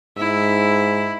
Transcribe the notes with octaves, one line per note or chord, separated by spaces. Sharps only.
G#2 E4